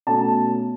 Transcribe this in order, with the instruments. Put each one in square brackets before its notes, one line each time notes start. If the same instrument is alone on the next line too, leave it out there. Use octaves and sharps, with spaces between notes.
[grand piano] B2 A3 C#4 A5